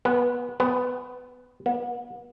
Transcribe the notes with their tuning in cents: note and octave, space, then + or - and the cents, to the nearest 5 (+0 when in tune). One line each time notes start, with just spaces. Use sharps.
B3 -15
B3 +15
B3 -40